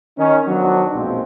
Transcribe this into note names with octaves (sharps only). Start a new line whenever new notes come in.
D#3 C#4 D#4
D#3 F3 F#3 B3 D4
B1 F#2 A#2 F3 G#3 C4